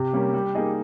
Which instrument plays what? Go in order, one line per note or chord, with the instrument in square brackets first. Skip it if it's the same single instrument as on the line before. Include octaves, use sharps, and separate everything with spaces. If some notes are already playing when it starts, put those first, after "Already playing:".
Already playing: [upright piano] C3 [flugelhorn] G4
[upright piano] G3 A#3 C#4
G3
A#3 D#4 G#4 D#5